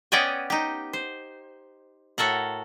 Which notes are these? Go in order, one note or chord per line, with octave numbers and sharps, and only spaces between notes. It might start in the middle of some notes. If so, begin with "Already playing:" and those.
B3 C#4 D5 D#5 G5 G#5
D#4 G4
C5
A2 F#4 A4 A#4 F#5